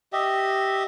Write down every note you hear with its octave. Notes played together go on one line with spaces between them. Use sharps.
G4 D#5 E5